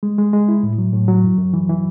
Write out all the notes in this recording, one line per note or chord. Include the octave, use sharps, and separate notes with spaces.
G#3
G#3
G#3
E4
A2
F#3
A2
F#3
F#2
F#2
E3
E3